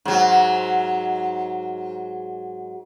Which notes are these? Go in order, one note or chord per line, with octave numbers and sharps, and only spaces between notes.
G#2 F#3